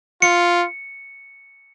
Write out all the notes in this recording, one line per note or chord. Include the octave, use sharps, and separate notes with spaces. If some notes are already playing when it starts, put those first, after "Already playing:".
F4 C#7